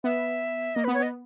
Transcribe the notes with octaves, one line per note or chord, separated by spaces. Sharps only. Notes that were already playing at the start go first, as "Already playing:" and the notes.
B3 E5
A#3 D#5
B3 B4
C#5
B3 D#5